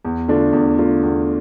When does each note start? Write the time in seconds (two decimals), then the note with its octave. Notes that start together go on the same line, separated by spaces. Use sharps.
0.05 E2
0.28 D3 A3 D4 F4
0.53 E2
0.79 D3 A3 D4 F4
1.03 E2